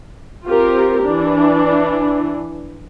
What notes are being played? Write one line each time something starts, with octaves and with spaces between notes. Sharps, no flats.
C4 F4 G4 A#4
E3 D4